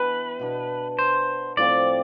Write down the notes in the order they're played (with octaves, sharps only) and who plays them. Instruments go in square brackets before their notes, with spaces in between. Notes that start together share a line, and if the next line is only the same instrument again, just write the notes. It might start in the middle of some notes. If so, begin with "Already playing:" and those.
Already playing: [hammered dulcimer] E3 B3 D4 G4 [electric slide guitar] B4
[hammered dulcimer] B2 B3 D4
[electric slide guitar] C5
[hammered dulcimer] A2 F3 C4 F4 [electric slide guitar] D5